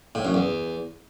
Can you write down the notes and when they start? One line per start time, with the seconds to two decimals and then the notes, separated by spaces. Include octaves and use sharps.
0.15 A2
0.25 F#2
0.34 E2